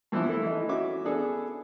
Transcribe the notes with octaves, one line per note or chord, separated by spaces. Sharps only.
G2 E3 F3 B3 E4
A3 E4 A4
E3 D#4
C#4 F#4 E5 D6
B3 D4 G#4 A4